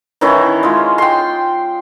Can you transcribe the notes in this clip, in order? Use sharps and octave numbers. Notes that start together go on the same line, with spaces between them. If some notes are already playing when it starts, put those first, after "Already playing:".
D#3 E3 C#4 E4
G#3 F4
G5 C6